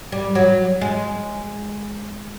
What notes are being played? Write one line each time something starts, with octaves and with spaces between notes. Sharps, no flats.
G3
F#3
G#3